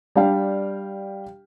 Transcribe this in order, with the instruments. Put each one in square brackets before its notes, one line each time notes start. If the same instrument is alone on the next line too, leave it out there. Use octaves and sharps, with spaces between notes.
[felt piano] G3 D4 F5 G5